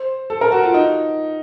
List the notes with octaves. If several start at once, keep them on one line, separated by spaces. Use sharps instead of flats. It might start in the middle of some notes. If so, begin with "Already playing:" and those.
Already playing: C5
A4
A#4
F#4
F4
D#4